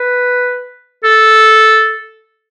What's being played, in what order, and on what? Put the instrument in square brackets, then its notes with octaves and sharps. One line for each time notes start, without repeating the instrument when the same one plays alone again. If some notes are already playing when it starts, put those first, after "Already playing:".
Already playing: [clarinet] B4
A4